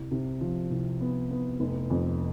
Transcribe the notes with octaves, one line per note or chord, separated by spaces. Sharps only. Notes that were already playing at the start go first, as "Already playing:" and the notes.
Already playing: C2
C3
F3
C2
B3
B3
F1
F2